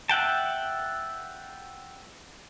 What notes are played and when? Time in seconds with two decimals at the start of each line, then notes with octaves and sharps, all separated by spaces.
0.09 E5 F#5 G5 A5